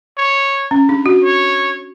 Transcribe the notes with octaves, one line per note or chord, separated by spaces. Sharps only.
C#5
C#4
D4
F#4
C#5